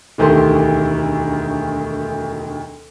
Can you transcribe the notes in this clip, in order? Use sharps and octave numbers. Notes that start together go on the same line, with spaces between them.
E1 D2 D#3 A3 G4 C6